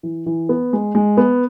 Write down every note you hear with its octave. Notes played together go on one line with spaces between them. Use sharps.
E3
E3
B3
G#3
G#3
B3